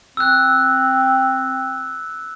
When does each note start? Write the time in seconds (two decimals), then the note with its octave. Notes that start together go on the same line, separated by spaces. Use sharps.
0.17 C4 E6 F#6